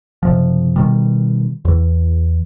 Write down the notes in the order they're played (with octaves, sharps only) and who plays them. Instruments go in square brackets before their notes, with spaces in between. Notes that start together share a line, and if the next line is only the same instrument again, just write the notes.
[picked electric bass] F#1 C3 F3
B2 D#3 G3
E2 E3